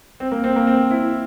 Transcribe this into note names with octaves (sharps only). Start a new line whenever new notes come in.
C4
A#3
C4
A#3
C4
E4